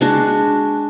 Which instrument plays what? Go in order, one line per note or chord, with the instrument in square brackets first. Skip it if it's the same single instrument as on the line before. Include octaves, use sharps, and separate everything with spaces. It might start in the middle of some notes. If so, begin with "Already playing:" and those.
[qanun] G#3 D4 F#4